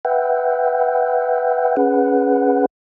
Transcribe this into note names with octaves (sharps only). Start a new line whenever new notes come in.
B4 E5 F#5 G5
C#4 G#4 B4 F#5